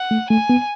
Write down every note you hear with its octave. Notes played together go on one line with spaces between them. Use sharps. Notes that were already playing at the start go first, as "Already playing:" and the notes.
Already playing: F#5
A3
A3 G#5
B3